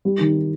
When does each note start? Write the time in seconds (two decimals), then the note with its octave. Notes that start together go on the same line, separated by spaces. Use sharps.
0.05 G3
0.20 D#3